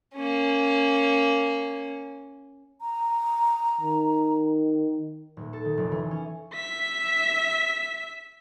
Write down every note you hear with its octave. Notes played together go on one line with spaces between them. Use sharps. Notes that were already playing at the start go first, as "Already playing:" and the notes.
A#3 C#4
A#5
D#3
D#1
A4
D#3
F1
E3
C#4
E5 B6